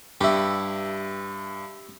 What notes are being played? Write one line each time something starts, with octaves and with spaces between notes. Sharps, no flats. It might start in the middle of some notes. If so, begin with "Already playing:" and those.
G2 E4 G4